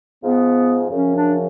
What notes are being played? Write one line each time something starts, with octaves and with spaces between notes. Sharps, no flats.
G#2 F3 B3
F#2 C#3 F3 C#4
D4